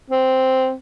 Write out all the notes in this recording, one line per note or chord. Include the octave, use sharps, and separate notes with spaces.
C4